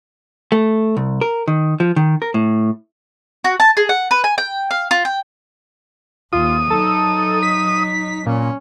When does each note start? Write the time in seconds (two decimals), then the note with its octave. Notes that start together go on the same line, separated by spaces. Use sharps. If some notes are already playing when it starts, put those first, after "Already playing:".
0.52 A3
0.97 C2
1.21 A#4
1.48 D#3
1.80 F3
1.96 D#3
2.22 A#4
2.34 A2
3.44 F#4
3.60 A5
3.77 G#4
3.89 F#5
4.11 B4
4.24 G#5
4.38 G5
4.71 F5
4.91 F4
5.05 G5
6.33 D#2 F4 D#6
6.70 F#3 D#4 A4
7.43 B6
8.26 A#2 C#4